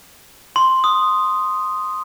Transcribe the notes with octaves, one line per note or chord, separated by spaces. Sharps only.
C6
D#6